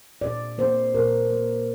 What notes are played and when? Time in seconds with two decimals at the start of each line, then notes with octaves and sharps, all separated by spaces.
0.21 A#2 D5
0.58 A#3 C5
0.94 A#2 A#4
1.31 A#3